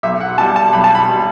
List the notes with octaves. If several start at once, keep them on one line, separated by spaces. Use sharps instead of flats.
B1 E5
F#5
B2 G3 A5
A5
B1 B5
A5
B5
B2 G3